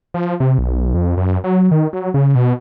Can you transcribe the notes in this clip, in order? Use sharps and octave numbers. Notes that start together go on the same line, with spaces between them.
F3
C3
B1
F2
F#2
F#3
D#3
F#3
C#3
B2